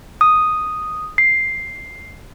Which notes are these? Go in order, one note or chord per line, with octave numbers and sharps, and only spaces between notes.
D#6
C7